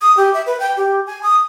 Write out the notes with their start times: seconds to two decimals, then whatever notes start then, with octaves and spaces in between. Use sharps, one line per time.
0.01 D#6
0.17 G4
0.34 E5
0.46 B4
0.60 G5
0.77 G4
1.07 G#5
1.23 D#6